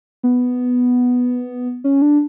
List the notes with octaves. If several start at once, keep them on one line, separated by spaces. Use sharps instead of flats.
B3
C#4
D4